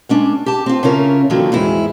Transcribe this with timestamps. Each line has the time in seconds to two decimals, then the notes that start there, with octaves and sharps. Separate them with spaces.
0.09 G#3 C#4 D4
0.46 G4 A5
0.66 C4 F4
0.83 C#3 C#4 E4 F4 A#4
1.30 G2 A#2 D3 D#3 F3 F#3
1.52 E2 G#2 E4 G#4